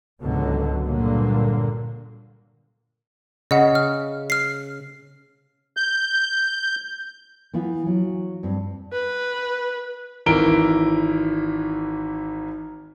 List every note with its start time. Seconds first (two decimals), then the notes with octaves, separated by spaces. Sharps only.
0.20 C#2 G#2 B2 D3 F#3
0.84 G2 A#2 D3 F#3 A#3
3.51 C#3 D#5 F#5
3.75 F6
4.30 F6 C7
5.77 G6
7.53 E3 B3 E4 F4
7.86 F#3 F4
8.43 G2 C4
8.93 B4
10.26 G#1 E3 E4 A#4 D7 G7